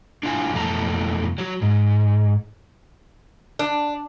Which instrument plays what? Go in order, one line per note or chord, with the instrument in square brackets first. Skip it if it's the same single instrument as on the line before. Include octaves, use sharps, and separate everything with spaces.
[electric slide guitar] D4 E4 F4 F5 G#5
F2 B2 E3 A3 A5 A#5
F#3 F#4
G#2
[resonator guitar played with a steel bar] D4